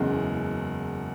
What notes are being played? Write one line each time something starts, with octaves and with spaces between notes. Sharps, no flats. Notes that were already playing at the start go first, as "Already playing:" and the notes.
Already playing: F#1 E2 C#3 G#3